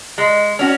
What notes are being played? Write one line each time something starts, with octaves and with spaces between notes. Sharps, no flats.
G#3
C#4 F#4